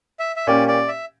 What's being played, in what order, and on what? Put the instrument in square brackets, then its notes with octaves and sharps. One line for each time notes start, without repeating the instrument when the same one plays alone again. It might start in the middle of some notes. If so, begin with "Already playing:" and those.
[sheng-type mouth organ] E5
E5
[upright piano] A#2 A#3 C#4 G4 [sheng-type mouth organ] D5
[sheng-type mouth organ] D5
E5